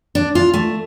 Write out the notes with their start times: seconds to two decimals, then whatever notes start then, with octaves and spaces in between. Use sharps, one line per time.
0.15 D4
0.35 F4
0.54 A3